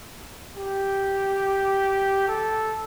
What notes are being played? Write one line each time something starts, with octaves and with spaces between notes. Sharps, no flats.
G4
A4